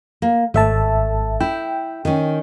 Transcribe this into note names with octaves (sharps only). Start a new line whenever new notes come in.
A#3
G#1 A3 E5 A5
E4 G5
D#3 C#4